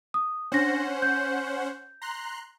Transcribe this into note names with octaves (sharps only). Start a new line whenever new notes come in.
D#6
C#4 D4 C5 F#5 A#6
G6
A#5 C6 F#6